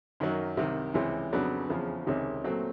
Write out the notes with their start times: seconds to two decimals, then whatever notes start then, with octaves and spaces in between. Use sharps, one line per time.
0.20 F#2 D#3 F#3
0.57 C2 C3 D#3
0.94 C#2 C3 E3
1.32 F2 C#3 F#3 B3 D4
1.69 E2 C#3 F3
2.07 C#2 C3 D#3
2.44 A#2 F#3 A3 C4